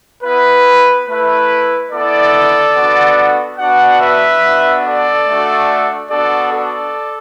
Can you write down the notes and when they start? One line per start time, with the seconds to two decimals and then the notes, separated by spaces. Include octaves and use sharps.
0.24 B3 E4 B4
1.07 A3 E4 B4
1.91 B3 E4 A4 D5
2.75 B3 D4 F#4
3.59 B3 D4 F#4 D5 F#5
4.01 B4 E5
4.43 B3 D4 F#4
4.85 A4 D5
5.27 A3 D4 F#4
6.10 B3 D4 F#4 A4 D5
6.52 A4 D5